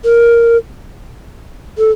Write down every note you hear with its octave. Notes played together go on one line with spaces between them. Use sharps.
A#4
A4